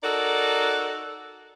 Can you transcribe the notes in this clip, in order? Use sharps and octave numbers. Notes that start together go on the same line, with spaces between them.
D#4 F#4 A4 A#4 D5